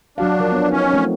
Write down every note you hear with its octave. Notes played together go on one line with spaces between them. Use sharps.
F#3 D4 F#4 F5
F3 A#4
B3 C#5
C#4 D#4
F3 A3 C4